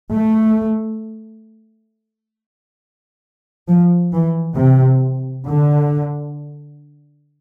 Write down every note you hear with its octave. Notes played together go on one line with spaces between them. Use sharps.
A3
F3
E3
C3
D3